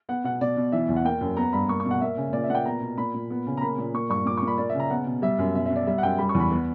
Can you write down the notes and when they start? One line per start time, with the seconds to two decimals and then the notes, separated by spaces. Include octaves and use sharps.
0.09 B3 F#5
0.24 B2 F#5
0.41 B2 D5
0.57 B2
0.72 E3 E5
0.89 E2
0.96 F#5
1.04 A#3 G5
1.21 F#2
1.37 B3 A#5
1.53 G2 B5
1.69 A#3 C#6
1.80 C#6
1.85 B2
1.91 F#5
2.01 A#3 E5
2.17 C#3
2.33 A#2 D5
2.44 E5
2.50 A#2 F#5
2.55 G5
2.65 B3 A#5
2.81 B2
2.98 A#2 B5
3.14 A#2
3.30 B3
3.46 C#3
3.57 A#5
3.61 A#3 B5
3.78 A#2
3.94 A#3 C#6
4.10 G2 C#6
4.26 A#2 D6
4.37 C#6
4.42 A#2 B5
4.58 A#3 D5
4.69 C#3 E5
4.80 A#5
4.90 B3 F#5
5.06 B2
5.22 G3 E5
5.39 F#2
5.55 B2 E5
5.66 B2 E5
5.76 D5
5.87 G3 E5
5.98 F#5
6.03 F#2 G5
6.18 G3 B5
6.29 C#6
6.35 E2
6.40 B5
6.51 B3